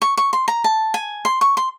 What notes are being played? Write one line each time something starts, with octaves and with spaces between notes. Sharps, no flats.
C#6
C#6
C6
A#5
A5
G#5
C6
C#6
C6